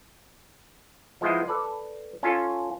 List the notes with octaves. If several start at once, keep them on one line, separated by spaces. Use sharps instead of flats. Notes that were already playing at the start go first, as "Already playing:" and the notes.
F3 G#3 B3 E4 C5 D#5
A4 B4 D5
C#4 F4 A4